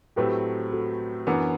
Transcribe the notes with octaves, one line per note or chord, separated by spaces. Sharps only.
A2 F#3 A3 C4 G4 B4
F#4 A4
F#2 E3 B3 D4 F#4